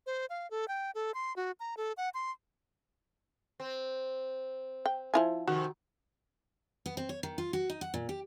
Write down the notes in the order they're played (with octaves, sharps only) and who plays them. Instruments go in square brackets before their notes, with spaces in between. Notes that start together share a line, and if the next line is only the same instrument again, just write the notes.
[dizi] C5
F5
A4
G5
A4
C6
F#4
A#5
A4
F#5
C6
[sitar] C4
[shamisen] G5
F3 E4 G#5
[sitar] F2 C3 D#3 [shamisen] F#4
[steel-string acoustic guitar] B3
C4
C#5
D#3
F4
F#4
D#4
F#5
A#2
G4